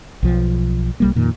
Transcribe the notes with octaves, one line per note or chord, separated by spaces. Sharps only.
B1 F3
C2 G3 A#3
F2 A#2 D#3